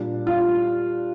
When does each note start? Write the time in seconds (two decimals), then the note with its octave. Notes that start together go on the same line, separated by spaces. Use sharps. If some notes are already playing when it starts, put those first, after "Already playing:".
Already playing: A#2 G3 D4
0.27 F4